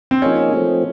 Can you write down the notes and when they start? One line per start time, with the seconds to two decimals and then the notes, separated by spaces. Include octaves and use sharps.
0.11 C4
0.22 F3 A#3 C#4 D#4 G#4
0.53 F3 A3 C4